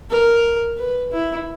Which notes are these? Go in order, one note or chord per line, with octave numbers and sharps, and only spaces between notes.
A#4
B4
E4